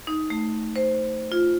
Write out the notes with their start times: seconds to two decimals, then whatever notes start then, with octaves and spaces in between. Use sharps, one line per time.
0.07 D#4
0.30 A3
0.76 C5
1.32 F4